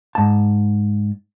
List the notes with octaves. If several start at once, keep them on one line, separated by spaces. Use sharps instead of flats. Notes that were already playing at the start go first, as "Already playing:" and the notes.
G#2 A5